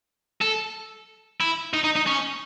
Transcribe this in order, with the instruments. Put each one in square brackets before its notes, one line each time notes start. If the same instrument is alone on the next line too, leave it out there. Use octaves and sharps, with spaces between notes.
[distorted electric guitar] A4
E4
D#4
D#4
D#4
C#4